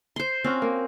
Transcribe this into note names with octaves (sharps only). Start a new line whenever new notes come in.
C5 C6
C4 C#4 F4 F#4
A#3